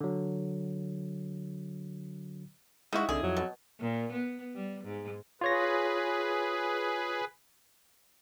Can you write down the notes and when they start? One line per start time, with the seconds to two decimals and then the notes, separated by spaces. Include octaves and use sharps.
0.01 D3 F#3
2.93 C#3 G#3 D#4 E4 F#4
3.09 C2 D3 G#4
3.23 F2 F#3
3.37 B2
3.80 A#2
4.12 B3
4.54 G3
4.84 G#2
5.41 F4 G#4 B4 C#5 A#6